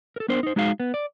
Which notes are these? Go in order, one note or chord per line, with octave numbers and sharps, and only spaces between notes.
A4 A#4
B3 D4 A#4 C5
D#4 C5
G#3 D#4 F#4 G#4 F5
B3
D5